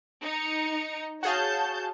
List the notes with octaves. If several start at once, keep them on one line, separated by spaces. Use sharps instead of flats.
D#4 C#7
F#4 G#4 C#5 F5 A5 G6